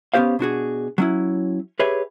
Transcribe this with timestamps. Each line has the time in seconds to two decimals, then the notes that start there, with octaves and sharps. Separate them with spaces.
0.14 B3 C#4 G4 C5 F5
0.39 B2 D4 F#4 G#4
0.98 F#3 C#4 E4
1.79 G4 G#4 B4 C#5 E5